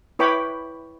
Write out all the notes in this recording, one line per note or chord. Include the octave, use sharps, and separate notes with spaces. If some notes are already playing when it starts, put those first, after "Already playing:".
E4 B4 C#5 G5 B5 D6